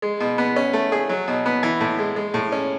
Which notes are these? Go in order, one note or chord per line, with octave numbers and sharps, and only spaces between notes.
G#3
B2
B3
C#4
A3
G#4
F#3
B2
B3
E3
A2
G#3
G#3
A2
C#4